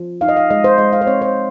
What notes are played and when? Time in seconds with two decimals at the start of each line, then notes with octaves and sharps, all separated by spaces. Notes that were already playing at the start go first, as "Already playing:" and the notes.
Already playing: F3
0.21 D#4 F5
0.29 D#5
0.37 F5
0.50 G#3 D#5
0.64 C5
0.78 G#3 D#5
0.93 F5
1.01 C5
1.07 C4 C#5
1.22 C5